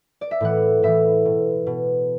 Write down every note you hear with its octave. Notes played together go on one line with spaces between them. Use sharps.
D5
E5
A2 E3 F#5
A2 E3 E5
B2
B2